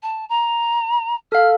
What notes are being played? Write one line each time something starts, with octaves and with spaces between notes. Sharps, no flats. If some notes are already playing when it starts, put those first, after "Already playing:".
A5
A#5
A4 F5 F6